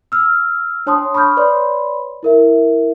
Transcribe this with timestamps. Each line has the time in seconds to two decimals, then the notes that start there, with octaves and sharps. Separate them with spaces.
0.12 E6 F6
0.86 D4 C#5 A5 C6 D#6
1.14 B5 C#6 D#6 F6 G6
1.37 B4 C#5 D5 B5 C6
2.23 E4 A#4 E5